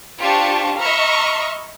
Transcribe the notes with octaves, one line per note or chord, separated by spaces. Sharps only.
D4 F4 G4 C5 A5 C#6
D#5 E5 A#5 B5 C#6 F6